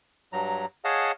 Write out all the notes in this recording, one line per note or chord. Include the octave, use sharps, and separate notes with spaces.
G2 F#3 A#5
G#4 C#5 D#5 F5 F#5 A5